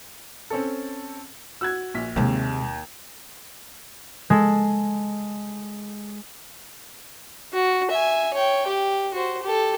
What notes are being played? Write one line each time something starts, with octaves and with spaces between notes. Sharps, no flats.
C4 C#4 A4
F#4 E6 F#6 G#6
A#1 B6
D#2 C3 G#3
G#3 A4
F#4
E5 G#5
C#5 G5
G4
F#4 C5
G4 A4